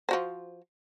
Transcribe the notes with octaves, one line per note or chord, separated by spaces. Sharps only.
F3 F#4 C5